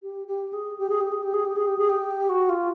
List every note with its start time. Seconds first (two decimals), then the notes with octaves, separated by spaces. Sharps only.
0.03 G4
0.28 G4
0.53 G#4
0.78 G4
0.89 G#4
1.01 G4
1.12 G#4
1.23 G4
1.34 G#4
1.45 G4
1.56 G#4
1.67 G4
1.79 G#4
1.90 G4
2.29 F#4
2.49 F4